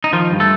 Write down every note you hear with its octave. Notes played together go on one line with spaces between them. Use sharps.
D#4
D#3 F3 F4
G2
A3 A4